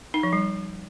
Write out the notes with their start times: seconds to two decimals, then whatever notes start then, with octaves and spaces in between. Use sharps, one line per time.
0.14 D#4
0.23 F3
0.33 G3